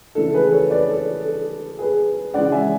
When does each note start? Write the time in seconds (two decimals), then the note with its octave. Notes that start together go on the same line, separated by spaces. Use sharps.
0.15 C#3 E3 A3 D4 A4
0.34 G#4 B4
0.52 A4 C#5
0.70 B4 D5
0.89 A4
1.25 A4
1.79 G#4 B4
2.34 C#3 E3 G#3 C#4 D5 F#5
2.52 E5 G#5